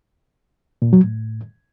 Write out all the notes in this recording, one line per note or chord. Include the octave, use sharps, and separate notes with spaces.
A#2
F#3
A2